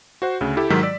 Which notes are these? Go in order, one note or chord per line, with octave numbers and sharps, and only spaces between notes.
F#4 C5 F#5
D2 C#3
E4 G4 A4
G#2 D#3 F#3 G#3 E6 B6
D5 E6